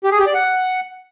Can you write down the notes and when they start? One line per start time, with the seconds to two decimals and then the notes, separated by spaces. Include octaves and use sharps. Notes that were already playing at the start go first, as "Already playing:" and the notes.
0.04 G4
0.12 G#4
0.19 G4
0.27 D5
0.34 F#5